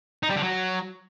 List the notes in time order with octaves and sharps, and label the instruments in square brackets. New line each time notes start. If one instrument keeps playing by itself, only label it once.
[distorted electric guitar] D#4
G3
D3
F#3